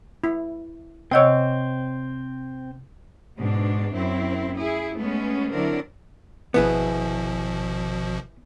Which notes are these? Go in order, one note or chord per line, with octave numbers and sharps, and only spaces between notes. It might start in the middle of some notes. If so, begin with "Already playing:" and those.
E4
C3 C4 C#5 D#5 F#5 G5 E6
G#2 B2 D4
F#2 C4 E4
E4 G#4
G#3 A3 B3 C#4
D3 F#3 C4 D4 E4 A#4
G#1 B2 F3 B3 E4 G#4